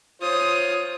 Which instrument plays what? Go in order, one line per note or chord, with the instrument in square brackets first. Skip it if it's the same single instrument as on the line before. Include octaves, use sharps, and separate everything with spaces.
[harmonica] F4 C5 C#5 [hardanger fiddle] D#6